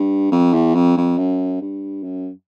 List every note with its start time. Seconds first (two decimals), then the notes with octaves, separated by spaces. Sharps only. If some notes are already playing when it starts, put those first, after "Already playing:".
Already playing: G2
0.32 F2
0.53 E2
0.75 F2
0.97 F2
1.18 F#2
1.62 G2
2.04 F#2